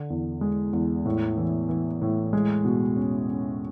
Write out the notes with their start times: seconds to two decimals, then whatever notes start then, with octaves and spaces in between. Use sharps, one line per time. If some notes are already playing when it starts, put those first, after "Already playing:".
Already playing: D3
0.10 E2
0.41 G#3
0.73 E2
1.06 A2
1.37 E3
1.69 E3
2.02 A2
2.33 G#3
2.65 B2
2.96 C#4
3.29 C#4